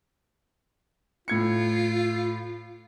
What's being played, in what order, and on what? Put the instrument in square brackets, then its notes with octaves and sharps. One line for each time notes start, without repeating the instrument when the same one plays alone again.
[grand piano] A2 G#6 C#7 [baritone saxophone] F4